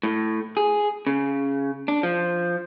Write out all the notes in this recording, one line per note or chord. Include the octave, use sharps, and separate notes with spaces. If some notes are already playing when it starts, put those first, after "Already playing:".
A2
G#4
C#3
D4
F3